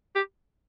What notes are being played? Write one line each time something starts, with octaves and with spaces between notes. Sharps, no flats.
G4